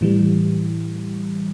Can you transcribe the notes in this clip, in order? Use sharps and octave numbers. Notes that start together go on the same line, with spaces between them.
A2 E3 G3